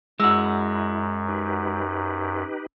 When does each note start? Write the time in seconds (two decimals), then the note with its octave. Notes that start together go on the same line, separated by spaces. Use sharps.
0.20 F#2 G#3 E4 F#4 E6
1.28 D#4 G4 B4